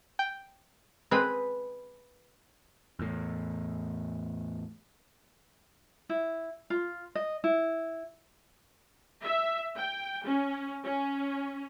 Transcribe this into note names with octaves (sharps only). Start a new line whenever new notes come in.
G5
G#3 C4 B4 B5
E2 A2
E4
F4
D#5
E4
E5
G5
C#4
C#4